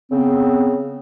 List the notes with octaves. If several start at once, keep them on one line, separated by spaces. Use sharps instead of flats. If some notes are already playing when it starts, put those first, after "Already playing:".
C#3 B3 C4